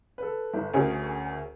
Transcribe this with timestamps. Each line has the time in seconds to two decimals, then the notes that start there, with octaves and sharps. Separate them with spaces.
0.18 A4 B4
0.54 G1
0.73 D2 C#4 G#4 A#4